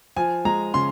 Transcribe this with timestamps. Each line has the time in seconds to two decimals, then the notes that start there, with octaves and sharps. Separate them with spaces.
0.17 F3 G#5
0.45 G#3 A#5
0.74 C#3 C6